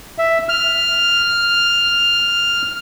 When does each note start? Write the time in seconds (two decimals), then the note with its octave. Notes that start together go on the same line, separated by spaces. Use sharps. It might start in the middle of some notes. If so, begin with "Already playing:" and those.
0.18 E5
0.49 F6